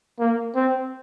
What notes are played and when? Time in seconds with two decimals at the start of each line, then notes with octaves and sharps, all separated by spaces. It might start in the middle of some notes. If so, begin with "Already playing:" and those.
0.20 A#3
0.56 C4